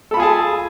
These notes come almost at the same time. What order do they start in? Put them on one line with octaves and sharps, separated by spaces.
A4 B5 F4 G#4 A5